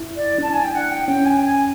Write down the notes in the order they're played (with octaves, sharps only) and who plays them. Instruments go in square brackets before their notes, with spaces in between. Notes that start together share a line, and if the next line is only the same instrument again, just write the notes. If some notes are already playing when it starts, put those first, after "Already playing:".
Already playing: [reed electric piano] E4
[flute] D5
[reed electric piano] D4 [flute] A5
[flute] G#5
G5
F#5
G5
[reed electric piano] C#4 [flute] G5
[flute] G#5
G#5